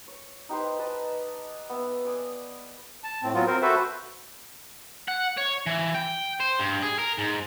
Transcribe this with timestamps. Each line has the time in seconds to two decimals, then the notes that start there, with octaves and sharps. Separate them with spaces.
0.08 C#5
0.49 D#4 G4 B4 C5
0.79 B4 D#5 A5
1.70 B3 E5
2.05 D5 G#5 D6 D#6
3.04 A5
3.23 A2 C4
3.34 F#3 B3 C4 F4
3.47 C4 A#4 C5
3.62 F#4 A4 B4 C5 E5
5.08 F#5
5.38 C#5
5.66 E3
5.94 G5
6.40 C5
6.60 G2
6.82 G#4
6.99 A#4
7.18 G#2